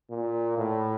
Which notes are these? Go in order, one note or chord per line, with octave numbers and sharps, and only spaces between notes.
A#2
A2